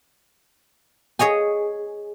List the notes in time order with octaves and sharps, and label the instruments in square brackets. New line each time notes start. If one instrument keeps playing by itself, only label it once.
[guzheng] G#4 C#5 D#5 G#5